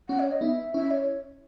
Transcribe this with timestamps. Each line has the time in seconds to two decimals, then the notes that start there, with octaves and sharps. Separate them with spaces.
0.09 C#4 F#5
0.20 C#5
0.31 D#5
0.41 B3 D#4 E5
0.74 C#4 E4 E5
0.91 C#5